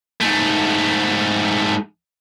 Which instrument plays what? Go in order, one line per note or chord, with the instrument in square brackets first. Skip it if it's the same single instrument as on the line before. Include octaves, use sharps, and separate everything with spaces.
[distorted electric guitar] G#2 A3